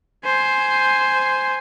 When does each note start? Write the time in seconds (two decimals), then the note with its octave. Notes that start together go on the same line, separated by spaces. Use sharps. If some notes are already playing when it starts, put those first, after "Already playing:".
0.25 C5 G#5